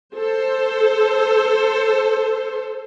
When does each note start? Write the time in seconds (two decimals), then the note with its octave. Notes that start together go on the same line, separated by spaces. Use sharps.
0.14 A4 C5